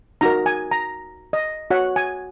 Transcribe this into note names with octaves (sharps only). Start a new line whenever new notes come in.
D#4 F#4 A#4 A#5
G#5
A#5
D#5
F#4 C#5 F#5
G#5